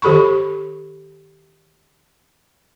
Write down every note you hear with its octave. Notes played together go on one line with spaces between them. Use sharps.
D#3 G4 A4 B5 C#6